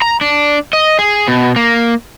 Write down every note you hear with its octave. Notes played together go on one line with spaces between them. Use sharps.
A#5
D4
D#5
G#4
B2
A#3